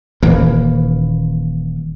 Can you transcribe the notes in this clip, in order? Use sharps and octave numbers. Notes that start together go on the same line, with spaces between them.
D#1 E3 A#3